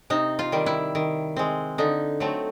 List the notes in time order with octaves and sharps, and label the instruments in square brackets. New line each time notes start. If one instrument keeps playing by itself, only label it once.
[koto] C3 D#4
F4
D#3 G3
E4
D#3
G#3 C4
D3 D#4
F#3 A3 C4